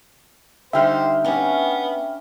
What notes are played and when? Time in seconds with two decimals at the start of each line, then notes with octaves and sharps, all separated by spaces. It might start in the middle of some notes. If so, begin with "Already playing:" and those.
0.73 D3 G3 D#4 C5 E5 G5 F6
1.25 B3 C#4 D4